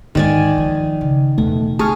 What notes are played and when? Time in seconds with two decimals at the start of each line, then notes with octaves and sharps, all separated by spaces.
0.15 G#2 D#3 D5 G#5
0.58 F3
1.01 C#3
1.38 E2 B2 A3
1.79 A3 G#4 A5 C#6 F6